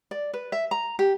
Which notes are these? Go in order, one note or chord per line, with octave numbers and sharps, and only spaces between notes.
D5
B4
E5
A#5
G4